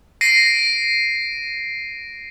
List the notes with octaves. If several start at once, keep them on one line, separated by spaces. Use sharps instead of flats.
A#6 C7 D7 D#7